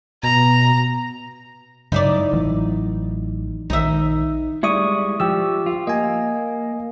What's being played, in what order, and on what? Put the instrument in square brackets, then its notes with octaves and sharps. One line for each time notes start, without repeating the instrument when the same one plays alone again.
[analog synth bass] B2 [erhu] A#5
[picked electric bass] G2 C#3 F#3 [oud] D#4 E4 D5
[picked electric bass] A1 E3 F#3
[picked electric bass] A#1 D#3 [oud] D#4 E5
[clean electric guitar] G3 G#3 E4 [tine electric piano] D5 C#6 D#6
[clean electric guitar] F3 [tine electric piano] G4 E6
[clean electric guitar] F4
[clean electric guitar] A#3 [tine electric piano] D#5 G#5